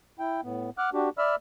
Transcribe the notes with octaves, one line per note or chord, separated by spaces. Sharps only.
E4 G5
A2 B3
F#5 D6 F6 F#6
D4 F#4 G4
D5 E5 B5 E6 F6